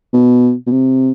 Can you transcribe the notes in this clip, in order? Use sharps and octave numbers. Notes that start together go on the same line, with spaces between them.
B2
B2
C3